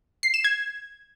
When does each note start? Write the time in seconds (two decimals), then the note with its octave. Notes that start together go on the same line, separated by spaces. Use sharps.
0.23 C7
0.34 E7
0.44 G#6